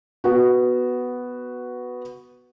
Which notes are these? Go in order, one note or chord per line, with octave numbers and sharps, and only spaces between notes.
B3 F#4